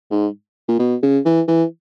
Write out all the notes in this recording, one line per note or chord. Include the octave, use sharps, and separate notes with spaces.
G#2
A#2
B2
C#3
E3
E3